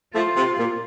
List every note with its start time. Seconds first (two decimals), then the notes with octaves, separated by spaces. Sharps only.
0.15 F3 A3 F4
0.36 C3
0.58 A#2